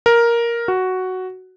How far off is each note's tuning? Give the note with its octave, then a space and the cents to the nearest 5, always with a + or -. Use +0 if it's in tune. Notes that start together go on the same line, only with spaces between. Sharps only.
A#4 +5
F#4 +5